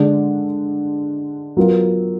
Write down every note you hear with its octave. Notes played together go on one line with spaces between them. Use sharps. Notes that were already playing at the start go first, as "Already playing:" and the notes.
Already playing: D3 G#3 D4
F#3 B3 F4 A#4